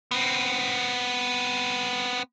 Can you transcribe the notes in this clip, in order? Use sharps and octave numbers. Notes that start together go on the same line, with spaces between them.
B3 C4